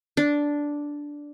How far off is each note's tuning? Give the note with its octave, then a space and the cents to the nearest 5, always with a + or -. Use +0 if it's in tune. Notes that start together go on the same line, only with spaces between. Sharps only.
D4 -5